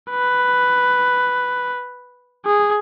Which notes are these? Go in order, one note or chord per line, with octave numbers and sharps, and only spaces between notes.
B4
G#4